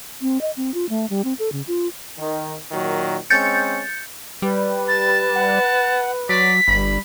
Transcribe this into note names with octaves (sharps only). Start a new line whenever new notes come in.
C4
D#5
C4
F4
A3
G3
C4
A4
C#3
F4
D#3
A#2 D#3 F#3
G#3 C4 C#4 G6 A6 C#7
G3 B4
A5 A6
F#5
F#3 D5 B6
G1 G3 B5